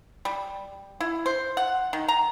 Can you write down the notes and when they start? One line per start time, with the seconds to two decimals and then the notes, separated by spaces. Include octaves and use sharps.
0.25 G3
1.00 E4
1.26 C5
1.57 F#5
1.93 D#3
2.08 A#5